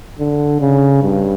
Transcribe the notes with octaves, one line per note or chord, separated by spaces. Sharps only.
D3
C#3
G2